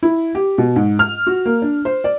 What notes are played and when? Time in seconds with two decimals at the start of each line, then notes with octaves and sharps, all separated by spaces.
0.03 E4
0.35 G4
0.58 B2
0.76 G#2
0.99 F6
1.27 F#4
1.46 A#3
1.62 D4
1.85 C5
2.04 D5